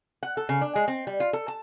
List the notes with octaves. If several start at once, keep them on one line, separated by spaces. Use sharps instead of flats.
F#5
A4
C#3
D4
G#3
C4
G3
F4
A4
A5